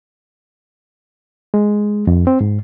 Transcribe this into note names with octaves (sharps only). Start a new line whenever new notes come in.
G#3
F2
C4
G#2